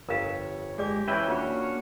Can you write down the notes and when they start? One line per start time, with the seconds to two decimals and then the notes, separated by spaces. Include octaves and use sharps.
0.09 G1 F2 A#4 C#5 F5 A5
0.78 G#3 G4 G#4 D5 D6
1.08 F2 E3 C#4 E4 B4 E5 G5
1.28 A#3 C#4 D4 F4 F#4 C#5